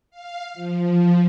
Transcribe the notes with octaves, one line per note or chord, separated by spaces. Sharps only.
F5
F3